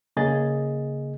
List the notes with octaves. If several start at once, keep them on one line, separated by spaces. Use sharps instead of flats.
C#3 A#3 G#4 D#5 A6